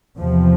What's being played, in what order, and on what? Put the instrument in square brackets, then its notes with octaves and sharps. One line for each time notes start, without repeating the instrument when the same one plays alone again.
[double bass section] E2 C3 F3